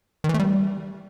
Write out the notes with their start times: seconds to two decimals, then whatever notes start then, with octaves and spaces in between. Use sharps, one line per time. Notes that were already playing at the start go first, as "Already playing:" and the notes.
0.24 D#3
0.29 E3
0.34 A3
0.39 G3